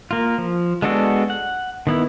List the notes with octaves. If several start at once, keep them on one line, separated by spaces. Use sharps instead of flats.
A#3 F4
F3
G#3 B3 D4 F#4 A4
F#5
D#3 B3 E4